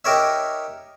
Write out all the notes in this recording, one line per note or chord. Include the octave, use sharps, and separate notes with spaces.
D#4 G4 A#4 C#5 E5